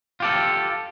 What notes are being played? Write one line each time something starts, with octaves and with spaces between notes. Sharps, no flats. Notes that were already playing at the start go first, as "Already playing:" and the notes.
F4 G4 A4